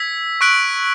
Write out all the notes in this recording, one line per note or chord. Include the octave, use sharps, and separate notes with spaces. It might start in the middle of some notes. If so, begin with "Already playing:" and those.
Already playing: E6 G#6 B6
C#6 F#6 B6 D7 F#7